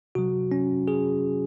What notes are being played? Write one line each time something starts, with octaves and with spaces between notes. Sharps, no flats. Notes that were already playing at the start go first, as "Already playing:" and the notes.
C3 F#3 F#4
C#4
G#4